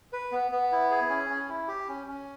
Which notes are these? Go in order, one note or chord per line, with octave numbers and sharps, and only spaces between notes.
B4
B3
B3
E4
G#4
C#4
C#4
E4
G4
C#4
C#4